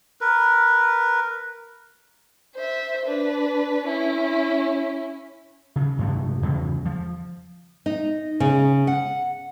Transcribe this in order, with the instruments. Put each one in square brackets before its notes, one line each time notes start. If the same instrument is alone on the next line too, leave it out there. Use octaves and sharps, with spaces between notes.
[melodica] A#4 B4
[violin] C5 E5
D4 B4
C#4 E4
[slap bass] C#3
G2 C3 F3 A3
E2 C#3
F3
[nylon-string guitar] D#4
C#3
F#5